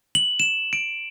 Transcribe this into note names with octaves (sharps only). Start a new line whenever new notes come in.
F#7
E7
D7